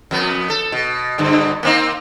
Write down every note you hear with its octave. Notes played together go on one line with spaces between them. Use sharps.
F2 B3
A4
B2
G2 B2 D3
A#3 C4 D#4